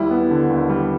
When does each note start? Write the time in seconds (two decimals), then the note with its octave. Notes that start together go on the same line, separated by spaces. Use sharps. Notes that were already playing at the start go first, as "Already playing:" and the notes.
Already playing: D#2 G3 E4
0.11 B3
0.31 D3
0.50 D#2
0.69 G3